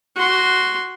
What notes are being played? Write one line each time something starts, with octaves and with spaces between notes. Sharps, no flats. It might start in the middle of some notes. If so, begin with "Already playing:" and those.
F#4 C6